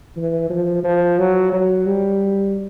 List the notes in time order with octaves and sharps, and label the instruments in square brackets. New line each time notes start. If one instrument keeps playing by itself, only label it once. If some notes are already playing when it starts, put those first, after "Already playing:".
[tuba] E3
F3
F3
F#3
F#3
G3